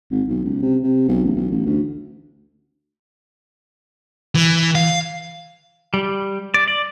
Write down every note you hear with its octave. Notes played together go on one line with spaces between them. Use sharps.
G#1
B1
C#2
C3
C3
B1
A1
B1
A1
D2
E3
F5
G3
D5
D5